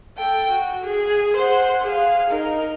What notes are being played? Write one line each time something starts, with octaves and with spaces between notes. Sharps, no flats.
A4 G5
F#4
G#4
C5 F#5
G#4 F5
D#4 A#4